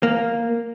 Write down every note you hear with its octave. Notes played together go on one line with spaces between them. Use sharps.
A#3